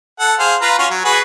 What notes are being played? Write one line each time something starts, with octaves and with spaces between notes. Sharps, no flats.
A4 F#5
G#4 C5 F5
F4 B4 A#5
C#4 F4 F#4
F#3
F#4 G#4 B4